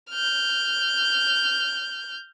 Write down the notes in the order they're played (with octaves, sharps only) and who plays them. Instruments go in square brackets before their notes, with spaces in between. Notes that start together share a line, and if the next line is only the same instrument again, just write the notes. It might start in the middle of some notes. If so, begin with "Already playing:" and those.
[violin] F6 G6